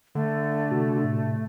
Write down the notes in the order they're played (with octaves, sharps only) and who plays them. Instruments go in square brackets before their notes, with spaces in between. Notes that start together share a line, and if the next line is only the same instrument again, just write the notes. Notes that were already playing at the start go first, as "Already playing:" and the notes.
[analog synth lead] D3 [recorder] A3
[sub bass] C3 [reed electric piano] F#4
[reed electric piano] A2